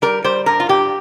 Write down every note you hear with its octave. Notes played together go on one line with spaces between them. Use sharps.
G3 A#4
G3 C5
G2 A#4
F4
G2 G4